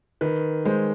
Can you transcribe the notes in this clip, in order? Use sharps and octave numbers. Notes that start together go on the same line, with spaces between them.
D#3 B4
G#3 C5